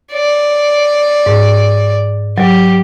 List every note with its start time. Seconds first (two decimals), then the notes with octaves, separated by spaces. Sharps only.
0.12 D5
1.26 G#2
2.38 F#3 G4